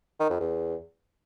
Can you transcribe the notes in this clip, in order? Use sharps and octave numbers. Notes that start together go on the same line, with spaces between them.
D#3
F2
E2